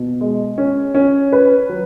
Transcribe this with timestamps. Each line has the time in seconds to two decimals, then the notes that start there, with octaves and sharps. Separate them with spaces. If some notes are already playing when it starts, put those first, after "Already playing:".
Already playing: B2
0.21 G#3
0.58 C#4
0.95 C#4
1.33 B4
1.69 F#3